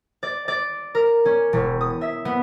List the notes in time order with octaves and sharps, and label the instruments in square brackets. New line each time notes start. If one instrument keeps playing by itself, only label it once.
[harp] D5
D5
A#4
C#4
E1
D#6
E5
B3